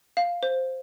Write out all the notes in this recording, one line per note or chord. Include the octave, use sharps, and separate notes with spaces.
F5
C5